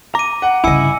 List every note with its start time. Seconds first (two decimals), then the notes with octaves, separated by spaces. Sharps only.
0.15 A#5 D6 D#7
0.42 F#5
0.64 G2 C#3 E4 D#5 G#5 E6 C#7